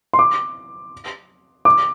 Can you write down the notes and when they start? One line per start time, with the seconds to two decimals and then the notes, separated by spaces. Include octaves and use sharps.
0.13 C6
0.19 D6
1.65 D6